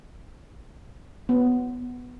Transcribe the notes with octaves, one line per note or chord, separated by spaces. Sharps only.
B3